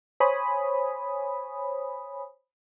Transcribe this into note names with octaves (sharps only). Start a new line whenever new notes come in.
C5 C#5 G#5 B5 D#6